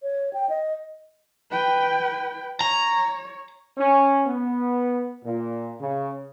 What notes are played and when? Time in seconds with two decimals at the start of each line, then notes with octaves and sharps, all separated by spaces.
0.03 C#5
0.33 G5
0.49 D#5
1.51 B4 G5
2.61 C#5 A#5
3.78 C#4
4.26 B3
5.23 A#2
5.80 C#3